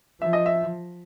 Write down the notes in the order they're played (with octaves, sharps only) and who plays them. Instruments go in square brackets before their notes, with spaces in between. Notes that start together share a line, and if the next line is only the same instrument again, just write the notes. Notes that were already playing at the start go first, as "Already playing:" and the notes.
[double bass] F3 [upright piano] E5
[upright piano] D#5
E5